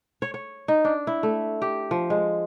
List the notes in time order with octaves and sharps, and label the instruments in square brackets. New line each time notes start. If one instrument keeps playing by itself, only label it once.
[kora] C#5
C#5
D#4
D4
E4
A3
G4
F3
G#3